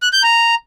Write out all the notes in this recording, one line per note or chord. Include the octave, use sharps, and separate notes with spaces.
F#6
G6
A#5